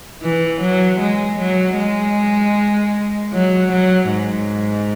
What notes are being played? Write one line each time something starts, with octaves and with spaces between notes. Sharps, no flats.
E3
F#3
G#3
F#3
G#3
F#3
F#3
G#2